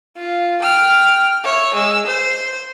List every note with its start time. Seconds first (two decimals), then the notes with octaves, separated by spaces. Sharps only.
0.17 F4
0.62 G5 F6
1.44 C#5 E5
1.74 G#3 E6
2.06 C5